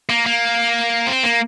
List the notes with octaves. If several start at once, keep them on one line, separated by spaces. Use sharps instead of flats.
A#3
A#3
C4
A#3